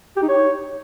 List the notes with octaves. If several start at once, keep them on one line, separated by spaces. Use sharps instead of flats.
G4
D#4
C#5